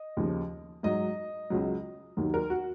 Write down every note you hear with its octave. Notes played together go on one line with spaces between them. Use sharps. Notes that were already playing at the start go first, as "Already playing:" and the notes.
Already playing: D#5
D#2 C#3 F3
G#2 F#3 D#5
C#2 C#3 F#3
D#2 D#3 F#3
A#4
F#4